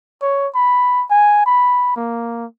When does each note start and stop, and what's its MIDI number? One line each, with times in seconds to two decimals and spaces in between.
0.22 0.48 73
0.55 1.04 83
1.10 1.41 80
1.46 1.91 83
1.96 2.46 58